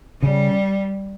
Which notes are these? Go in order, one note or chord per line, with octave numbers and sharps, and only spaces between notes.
C#3 G3